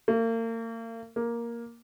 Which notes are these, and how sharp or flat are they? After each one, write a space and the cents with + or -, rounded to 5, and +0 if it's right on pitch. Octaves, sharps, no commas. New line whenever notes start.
A#3 -40
A#3 +5